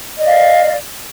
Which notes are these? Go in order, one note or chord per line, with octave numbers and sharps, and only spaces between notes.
D5 D#5 F5